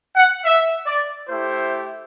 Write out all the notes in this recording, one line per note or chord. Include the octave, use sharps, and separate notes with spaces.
F#5
E5
D5
A3 E4 G4 C5